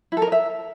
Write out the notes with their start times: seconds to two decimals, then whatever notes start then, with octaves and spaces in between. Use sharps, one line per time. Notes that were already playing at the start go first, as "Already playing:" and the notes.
0.12 E4
0.17 A4
0.22 A#4
0.27 D#5
0.32 E5